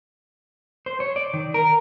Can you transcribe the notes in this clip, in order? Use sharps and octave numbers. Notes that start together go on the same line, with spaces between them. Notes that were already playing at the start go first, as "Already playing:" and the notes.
C5
C#5
D5
D#3
A#4